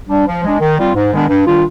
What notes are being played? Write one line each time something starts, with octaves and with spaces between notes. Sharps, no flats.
G3 D4
F3
G#3 D4
D#3
G3 C4 F4
G#2
D#3 G#3 B3 D4
G2
D#3 G3 D4 F4